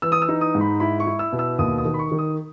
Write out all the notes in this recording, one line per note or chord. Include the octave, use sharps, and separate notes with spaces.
E3 E6
D#6
E6
D#4
D#6
G#2
B5
E4 B5
C#6
E4
E6
B2
E6
D#2 D#6
D#6
D#3
B5
C#6
D#3
D#6